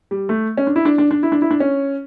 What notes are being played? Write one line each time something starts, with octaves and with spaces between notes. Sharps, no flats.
G3
A3
C#4
D4
E4
D4
D4
D4
E4
D4
E4
D4
C#4